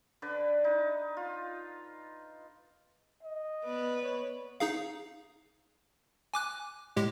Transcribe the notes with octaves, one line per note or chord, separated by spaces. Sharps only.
D3 B4 D5
D#4
F4
D#5
B3 B4 D5
C#5
D#4 G#4 F5
G#5 D6 F#6
A2 G#3 G4